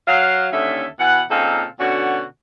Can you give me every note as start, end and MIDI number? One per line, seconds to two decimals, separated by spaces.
0.07 0.48 54
0.07 0.48 77
0.53 0.86 39
0.53 0.86 50
0.53 0.86 61
0.53 0.86 69
0.53 0.86 76
1.00 1.22 47
1.00 1.22 52
1.00 1.22 71
1.00 1.22 78
1.31 1.65 46
1.31 1.65 49
1.31 1.65 60
1.31 1.65 63
1.31 1.65 69
1.31 1.65 77
1.80 2.23 47
1.80 2.23 50
1.80 2.23 61
1.80 2.23 66